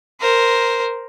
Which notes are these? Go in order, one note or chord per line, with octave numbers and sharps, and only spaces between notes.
A#4 C5